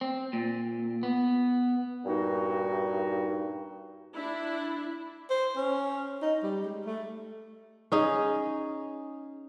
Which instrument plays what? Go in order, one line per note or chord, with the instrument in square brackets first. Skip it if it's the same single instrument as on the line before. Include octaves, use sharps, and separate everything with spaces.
[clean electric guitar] C4
A#2
B3
[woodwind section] G2 A#2 D#4 F#4
[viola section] D4 E4
[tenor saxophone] C5
C#4
D#4
G3
G#3
A3
[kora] C#4 D#4 G#4